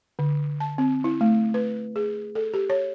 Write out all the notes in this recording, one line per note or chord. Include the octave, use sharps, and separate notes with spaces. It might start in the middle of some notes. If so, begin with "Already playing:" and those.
D3
A5
C4
E4
A3
B4
G#4
A4
G4
C#5